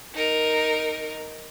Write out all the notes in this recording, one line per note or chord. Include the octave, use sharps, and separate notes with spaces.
D#4 A#4